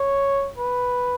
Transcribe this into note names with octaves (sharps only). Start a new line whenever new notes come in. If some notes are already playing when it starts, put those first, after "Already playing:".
Already playing: C#5
B4